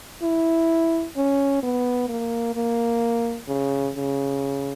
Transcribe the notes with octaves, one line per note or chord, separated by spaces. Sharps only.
E4
C#4
B3
A#3
A#3
C#3
C#3